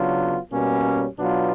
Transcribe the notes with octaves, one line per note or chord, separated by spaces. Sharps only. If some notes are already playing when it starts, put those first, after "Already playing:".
Already playing: C#3 F#3 B3 D4 F4
B2 G3 A#3 C#4
B2 F#3 B3 D4 F4